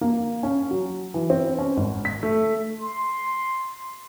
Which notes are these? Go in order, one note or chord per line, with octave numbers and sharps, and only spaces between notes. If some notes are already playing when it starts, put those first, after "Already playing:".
A#3
C#4
F#3
E3
C4
C#4
G#1
B6
A3
C6